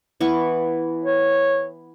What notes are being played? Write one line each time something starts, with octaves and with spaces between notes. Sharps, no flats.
E3 B3 C#6
C#5